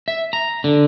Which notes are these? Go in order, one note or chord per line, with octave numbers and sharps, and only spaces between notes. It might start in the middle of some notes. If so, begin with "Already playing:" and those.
E5
A#5
D3